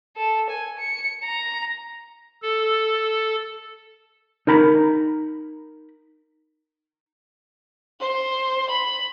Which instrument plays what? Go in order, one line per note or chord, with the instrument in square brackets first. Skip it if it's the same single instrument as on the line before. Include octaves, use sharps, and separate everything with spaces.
[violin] A4
G#5
C#7
A#5
[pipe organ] A4
[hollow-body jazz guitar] D#4 A#4 A#5 B5
[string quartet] C5
B5